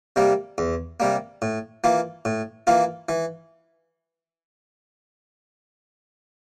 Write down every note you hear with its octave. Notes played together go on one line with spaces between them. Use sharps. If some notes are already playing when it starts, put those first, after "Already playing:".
C3 G3 A#3
E2
C3 G3 A#3
A2
E3 A#3 F4
A2
E3 A#3 F4
E3